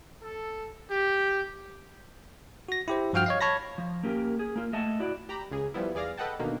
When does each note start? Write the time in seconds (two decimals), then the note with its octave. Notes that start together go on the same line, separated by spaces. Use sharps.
0.22 A4
0.91 G4
2.69 F#4 A#6
2.88 E4 G4 C5
3.13 G2 F3 F#4 F5 G5 F6
3.26 C#5 D#5 F5
3.41 C#5 A5 B5 A#6
3.78 F3
4.03 A#3 C#4 G4 A4 A#4
4.39 G#4
4.56 A#3 F4
4.73 A3 D#5 E5 F#5 A5
5.00 E4 F#4 D5
5.29 G4 A#5 B5
5.51 C#2 C#3 G#4
5.74 F3 G3 B3 E4
5.95 E2 G#4 D5 F5 A#6
6.17 A4 B4 D#5 F#5 G5 A5
6.39 B2 D3 D#3 A#3